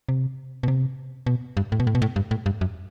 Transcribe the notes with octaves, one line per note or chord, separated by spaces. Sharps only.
C3
B2
C3
B2
G2
A2
B2
A2
B2
A2
G2
A2
G2
F#2